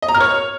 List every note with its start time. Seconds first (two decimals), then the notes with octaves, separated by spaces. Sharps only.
0.02 D#5
0.08 A#5
0.15 F6
0.21 C#5